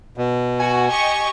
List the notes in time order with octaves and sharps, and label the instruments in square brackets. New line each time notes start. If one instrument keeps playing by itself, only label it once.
[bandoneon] B2
[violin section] F#4 [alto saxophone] G#5
[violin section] G4 D#5 C#6